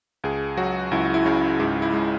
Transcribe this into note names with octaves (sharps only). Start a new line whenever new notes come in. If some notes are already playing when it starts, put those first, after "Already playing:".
C#2 G#4
F#3 F#4
C#2 E4
E4
C#3
G#2 E4
E4
G#3